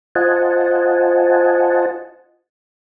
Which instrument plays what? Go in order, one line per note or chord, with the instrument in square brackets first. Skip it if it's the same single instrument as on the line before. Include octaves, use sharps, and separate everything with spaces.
[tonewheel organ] F4 C5 D#5 F#5 G#5 A5